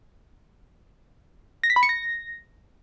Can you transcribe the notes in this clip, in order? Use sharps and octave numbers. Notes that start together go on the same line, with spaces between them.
A#6
B6
B5
C#7
A#6